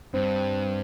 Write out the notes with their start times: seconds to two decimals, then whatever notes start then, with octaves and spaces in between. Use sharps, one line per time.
0.14 G2 C4